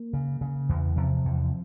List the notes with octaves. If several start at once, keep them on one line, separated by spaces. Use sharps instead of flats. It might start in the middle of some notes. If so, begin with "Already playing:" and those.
Already playing: A#3
C#3
C#3
E2
C3 F3
E2